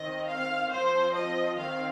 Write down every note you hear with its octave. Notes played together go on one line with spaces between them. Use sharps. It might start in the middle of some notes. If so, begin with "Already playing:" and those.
Already playing: D#3 C4 D#5
F5
F3 C4 C5
D#5
D#3 C4 F5